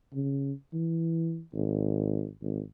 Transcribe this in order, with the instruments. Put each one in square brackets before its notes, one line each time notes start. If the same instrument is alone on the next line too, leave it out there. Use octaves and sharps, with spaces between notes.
[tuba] C#3
E3
G#1
G#1